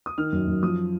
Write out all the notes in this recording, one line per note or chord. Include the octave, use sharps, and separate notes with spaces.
D#6
D#3 F6
F#2
F#2
F3 D#6